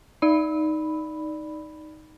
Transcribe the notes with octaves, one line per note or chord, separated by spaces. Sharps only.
D#4 D5 B5